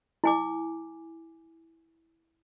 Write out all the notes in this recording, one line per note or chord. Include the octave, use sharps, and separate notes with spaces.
E4 G#5 D6